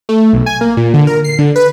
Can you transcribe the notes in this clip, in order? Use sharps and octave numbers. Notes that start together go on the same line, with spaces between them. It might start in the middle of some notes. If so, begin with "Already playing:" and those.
A3
B1
G#5
A#3
A#2
D3
A#4
C7
D3
B4